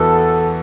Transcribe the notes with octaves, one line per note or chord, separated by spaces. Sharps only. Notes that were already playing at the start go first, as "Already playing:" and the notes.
Already playing: E2 E3 B3 F#4 A4